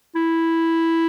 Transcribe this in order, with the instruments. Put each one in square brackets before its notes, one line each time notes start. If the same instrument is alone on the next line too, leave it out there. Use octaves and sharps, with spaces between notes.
[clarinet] E4